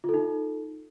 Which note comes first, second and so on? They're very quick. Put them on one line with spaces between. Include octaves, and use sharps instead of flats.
F4 A4 D#4